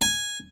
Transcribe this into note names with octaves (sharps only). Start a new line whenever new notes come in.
G#5